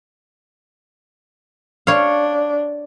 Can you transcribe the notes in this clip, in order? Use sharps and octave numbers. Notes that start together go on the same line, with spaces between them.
D4 C#5 F5